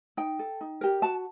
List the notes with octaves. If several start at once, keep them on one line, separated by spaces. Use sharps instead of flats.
D#4 G5
A4
D#4
G4 A#4
F#4 A5